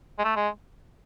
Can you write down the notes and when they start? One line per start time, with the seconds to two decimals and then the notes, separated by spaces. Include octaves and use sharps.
0.19 G#3
0.24 A3
0.36 G#3